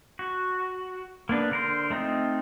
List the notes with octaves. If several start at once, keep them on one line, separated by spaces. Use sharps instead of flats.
F#4
A#3 B3 D4 B4
D3 A#4 C5
A3 C4 D#4 F4